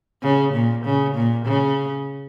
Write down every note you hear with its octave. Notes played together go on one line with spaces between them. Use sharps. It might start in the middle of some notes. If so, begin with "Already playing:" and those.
C#3
A#2
C#3
A#2
C#3